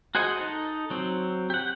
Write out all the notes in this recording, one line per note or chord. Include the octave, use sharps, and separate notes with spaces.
F#4 G#4 C5 D#5 F#5
D#4 A4 D#5
F#3 C4
G4 F#5